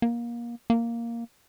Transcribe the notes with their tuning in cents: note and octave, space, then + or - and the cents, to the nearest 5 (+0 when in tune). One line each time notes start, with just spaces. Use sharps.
A#3 +25
A#3 +0